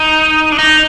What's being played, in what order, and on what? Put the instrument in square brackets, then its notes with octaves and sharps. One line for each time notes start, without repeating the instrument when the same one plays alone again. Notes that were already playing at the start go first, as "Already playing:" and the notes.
Already playing: [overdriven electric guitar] D#4
D4
D#4